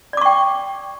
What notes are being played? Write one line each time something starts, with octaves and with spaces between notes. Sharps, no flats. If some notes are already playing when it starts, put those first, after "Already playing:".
D5 G5 C#6 D6